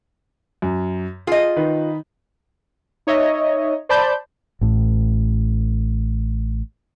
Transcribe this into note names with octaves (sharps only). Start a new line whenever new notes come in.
F#2
F4 G#4 D#5
D#3 D#4 B4
D#4 C#5 D#5 E5
C5 D5 A5 B5 G6
A1 A2